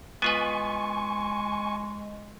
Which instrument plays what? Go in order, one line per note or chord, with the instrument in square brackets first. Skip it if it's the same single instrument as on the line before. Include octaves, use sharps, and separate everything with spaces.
[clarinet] G#3 [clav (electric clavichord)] B3 F4 B4 [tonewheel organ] G#5 C#6